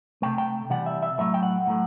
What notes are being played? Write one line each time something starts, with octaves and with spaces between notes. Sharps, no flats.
C3 F#3 A3 G5
G5
C3 E3 G3 F#5
E5
E5
A2 F#3 A3 E5
G5
F#5
A2 F#3 A3